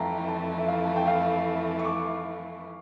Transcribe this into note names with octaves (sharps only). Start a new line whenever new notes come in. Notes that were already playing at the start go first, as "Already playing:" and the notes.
Already playing: F2 E3 A3 E4 F5 G5 A5 A#5
A5
E5
F5
A5
G5
F5
C#6
D6